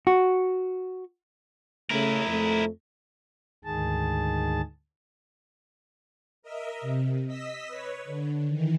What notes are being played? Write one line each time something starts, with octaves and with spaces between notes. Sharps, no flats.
F#4
C#3 A3 E4 A#4
F2 A3
D2 G#2 D#3 G#4 A5
A#4 D#5 E5
C3
D#5 E6 B6
B4 C#5
D3
D#3 E3